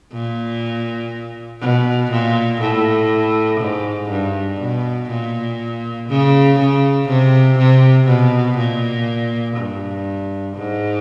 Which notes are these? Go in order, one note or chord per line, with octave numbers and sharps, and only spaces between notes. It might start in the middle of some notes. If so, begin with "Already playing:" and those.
A#2
B2
A#2
A2
G#2
G2
B2
A#2
C#3
C#3
C3
C3
B2
A#2
G2
G#2